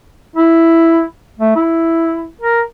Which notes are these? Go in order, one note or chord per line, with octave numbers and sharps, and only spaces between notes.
E4
A3
E4
A#4